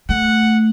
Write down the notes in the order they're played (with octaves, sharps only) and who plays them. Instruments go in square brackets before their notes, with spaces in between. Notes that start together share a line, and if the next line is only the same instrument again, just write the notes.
[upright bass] A3 [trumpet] F#5